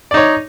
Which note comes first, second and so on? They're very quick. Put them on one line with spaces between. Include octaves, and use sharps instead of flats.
D5 D#4 C#5